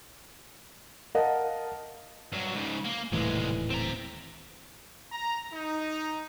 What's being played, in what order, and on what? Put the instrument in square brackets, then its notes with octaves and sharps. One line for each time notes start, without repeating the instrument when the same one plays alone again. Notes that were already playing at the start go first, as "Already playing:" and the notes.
[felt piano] A#4 D#5 F5 F#5 A5
[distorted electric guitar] G2 F#3
G#2 C#3
A#3
[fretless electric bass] D#1 A2 E3 [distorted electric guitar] C2 G#3
[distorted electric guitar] C4 A#5
[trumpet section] A#5
D#4